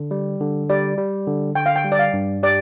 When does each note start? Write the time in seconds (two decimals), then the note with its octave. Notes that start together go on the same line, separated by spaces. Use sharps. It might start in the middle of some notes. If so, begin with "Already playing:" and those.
Already playing: D3
0.11 G3
0.41 D3
0.69 G3 D5
0.98 G3
1.27 D3
1.55 D3 G5
1.66 F5
1.76 G5
1.85 G3
1.92 D5
1.99 F5
2.13 G2
2.43 G4 D5